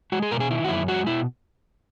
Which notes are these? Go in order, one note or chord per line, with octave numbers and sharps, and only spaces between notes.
G#3 F#4
G#4
B2 A#4
G#4
D#3 E4
F#4
F#2 E4
G#3 F#4
B2 E4